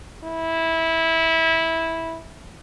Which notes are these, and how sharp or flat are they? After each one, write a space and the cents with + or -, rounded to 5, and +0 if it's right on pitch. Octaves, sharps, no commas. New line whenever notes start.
E4 -15